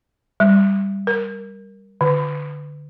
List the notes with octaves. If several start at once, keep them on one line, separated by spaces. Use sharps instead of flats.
G3
A#4
D3